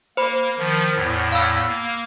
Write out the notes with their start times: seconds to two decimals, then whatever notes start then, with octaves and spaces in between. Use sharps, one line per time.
0.17 A#3 C5 B5
0.58 D#3 F3
0.95 E2 A2
1.32 F5 B5 E6
1.69 A#3